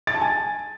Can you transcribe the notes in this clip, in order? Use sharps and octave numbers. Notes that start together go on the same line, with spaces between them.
A6
A5
G#5